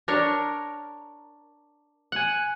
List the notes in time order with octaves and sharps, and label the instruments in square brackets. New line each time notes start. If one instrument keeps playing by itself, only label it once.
[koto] D4 A#4 C#5
[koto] F#5 [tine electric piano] G#5 F#6